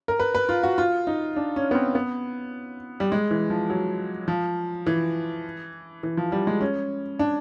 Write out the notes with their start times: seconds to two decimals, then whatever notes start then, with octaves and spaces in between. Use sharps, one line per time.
0.08 A#4
0.20 B4
0.35 B4
0.49 F4
0.63 F#4
0.78 F4
1.07 D#4
1.36 D4
1.56 C#4
1.71 B3
1.75 C4
1.95 B3
3.00 G3
3.12 G#3
3.31 E3
3.50 F3
3.70 F#3
4.28 F3
4.86 E3
6.03 E3
6.17 F3
6.32 G3
6.47 G#3
6.61 C#4
7.19 D4